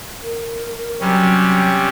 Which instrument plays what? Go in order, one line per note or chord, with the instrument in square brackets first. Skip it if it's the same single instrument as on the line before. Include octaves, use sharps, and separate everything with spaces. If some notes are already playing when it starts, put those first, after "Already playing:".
[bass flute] A#4
[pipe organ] C3 G3 C#4 [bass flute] F#3